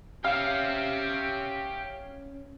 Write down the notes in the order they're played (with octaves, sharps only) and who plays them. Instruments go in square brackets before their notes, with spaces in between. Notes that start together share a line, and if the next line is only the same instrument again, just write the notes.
[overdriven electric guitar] C#4 [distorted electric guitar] G4 E5 [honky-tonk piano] F5